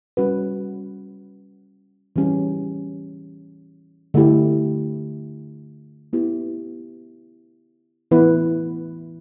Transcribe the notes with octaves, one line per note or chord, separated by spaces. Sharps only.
G3 C#4 F#4 B4
E3 G3 C#4 G4
D3 A3 E4 G4
B3 E4 G4
E3 B3 E4 B4